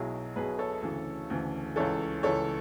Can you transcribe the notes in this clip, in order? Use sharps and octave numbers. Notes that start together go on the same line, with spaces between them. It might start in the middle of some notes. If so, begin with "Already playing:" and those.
Already playing: B1 B2 F#3 E4 G#4
B1 B2 F#3 G#4 B4
A4 C#5
D2 C#3 E3
D2 C#3 E3
C#2 C#3 E3 A4 C#5
C#2 C#3 E3 A4 C#5